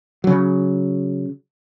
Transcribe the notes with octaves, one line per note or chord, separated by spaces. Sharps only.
C#3 F#3